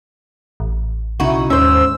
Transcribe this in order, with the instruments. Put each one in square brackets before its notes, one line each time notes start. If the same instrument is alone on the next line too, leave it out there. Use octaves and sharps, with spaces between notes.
[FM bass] A1
[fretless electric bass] B1 C#3 C#4 [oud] D#4 E4 F#4
[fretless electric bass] D#2 [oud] G#2 C5 [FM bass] C#4 [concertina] E6